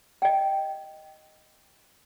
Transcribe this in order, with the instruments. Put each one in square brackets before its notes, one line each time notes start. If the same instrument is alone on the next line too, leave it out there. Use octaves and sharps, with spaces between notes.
[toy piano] D#5 G5